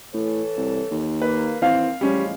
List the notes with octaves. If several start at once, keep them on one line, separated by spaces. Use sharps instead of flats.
A2 E3 A4 C#5
C2
D#2
A#3 B4
D#2 E3 C4 F5
A1 C#3 F3 G3 G#3 C#4